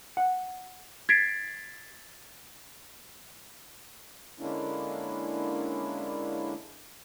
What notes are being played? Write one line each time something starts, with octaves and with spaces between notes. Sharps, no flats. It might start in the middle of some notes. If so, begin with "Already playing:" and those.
F#5
G#6 A6 B6 C7 D7
D3 G#3 A#3 C#4 D4 E4